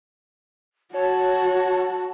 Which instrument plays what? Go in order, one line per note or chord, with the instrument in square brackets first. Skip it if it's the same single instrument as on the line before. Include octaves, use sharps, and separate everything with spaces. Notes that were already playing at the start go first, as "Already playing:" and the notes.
[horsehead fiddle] F#4 [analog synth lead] C#5 [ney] A5